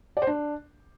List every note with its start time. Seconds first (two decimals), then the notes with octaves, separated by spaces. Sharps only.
0.17 D5
0.22 C5
0.27 D4